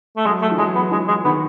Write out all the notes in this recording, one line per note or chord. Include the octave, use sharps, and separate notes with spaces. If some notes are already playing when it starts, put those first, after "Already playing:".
A3
F#3 G#3
A3
E3
F#3 G#3
B3
E3 G#3
G#3
D#3 B3